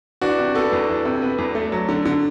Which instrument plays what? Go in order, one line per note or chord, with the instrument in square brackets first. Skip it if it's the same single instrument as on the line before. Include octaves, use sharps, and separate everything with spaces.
[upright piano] E3 [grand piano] D4 F#4
[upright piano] C3
[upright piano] B3 [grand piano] F#4 A4
[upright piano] E2
E3
C3
B3
E2
A3
F#3
D3
D3